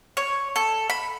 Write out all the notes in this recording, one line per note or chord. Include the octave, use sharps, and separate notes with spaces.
C#5
A4
B5